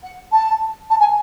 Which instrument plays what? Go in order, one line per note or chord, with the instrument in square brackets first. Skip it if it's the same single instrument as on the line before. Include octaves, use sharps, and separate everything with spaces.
[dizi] F#5
A5
A5
G#5